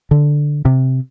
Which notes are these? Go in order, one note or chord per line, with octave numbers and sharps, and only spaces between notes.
D3
C3